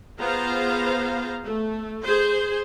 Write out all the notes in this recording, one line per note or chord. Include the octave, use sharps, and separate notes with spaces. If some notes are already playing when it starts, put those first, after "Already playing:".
B3 F4 G#4 C5 F5 A#5
A3
G#4 C5